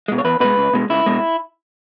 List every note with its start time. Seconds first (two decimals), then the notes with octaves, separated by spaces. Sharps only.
0.08 B2 G#3
0.18 C#5
0.24 E2 B4
0.41 B2 G#3 B4
0.58 C#2
0.73 B2 G#3
0.90 C#2 E4
1.06 B2 G#3